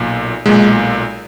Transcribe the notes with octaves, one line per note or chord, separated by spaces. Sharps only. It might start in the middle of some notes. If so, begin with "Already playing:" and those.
Already playing: B1 A#2
B1 A#2 G#3